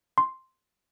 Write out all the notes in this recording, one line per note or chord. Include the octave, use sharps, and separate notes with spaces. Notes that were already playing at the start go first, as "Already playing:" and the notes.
C6